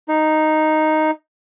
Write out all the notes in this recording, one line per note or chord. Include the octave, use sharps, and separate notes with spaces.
D#4